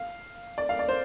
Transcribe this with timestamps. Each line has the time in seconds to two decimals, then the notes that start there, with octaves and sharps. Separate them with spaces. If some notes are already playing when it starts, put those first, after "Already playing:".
Already playing: F5
0.58 D5
0.69 F5
0.79 D5
0.88 C5